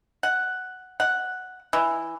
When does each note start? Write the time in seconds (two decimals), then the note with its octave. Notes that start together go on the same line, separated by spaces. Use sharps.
0.23 F#5
1.00 F#5
1.73 E3